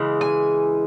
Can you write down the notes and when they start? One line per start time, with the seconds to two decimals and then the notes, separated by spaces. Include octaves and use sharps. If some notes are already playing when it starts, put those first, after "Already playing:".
Already playing: C#3 E3 G#3
0.21 G#5